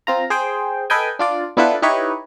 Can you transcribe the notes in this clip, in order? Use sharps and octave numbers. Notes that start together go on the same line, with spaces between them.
C4 F4 A#5
G#4 C5 G5
A4 B4 D#5 G5 G#5
D4 F4 D5
B3 D4 E4 F4 A4 B4
D#4 E4 G4 B4 C#5 D#5